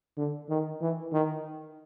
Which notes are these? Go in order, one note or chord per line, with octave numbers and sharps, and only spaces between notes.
D3
D#3
E3
D#3